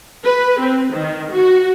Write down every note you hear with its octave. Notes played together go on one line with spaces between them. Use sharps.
B4
C4
D#3
F#4